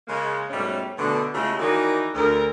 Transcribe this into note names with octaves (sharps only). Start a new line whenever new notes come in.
C#3 G#3 A#3
G#2 B2 G3 A3 C#4
B2 D3 A3
C#3 G#3 A3 E4 F4 G4
D#3 E3 A#3 D#4 F#4 D5
D2 A#4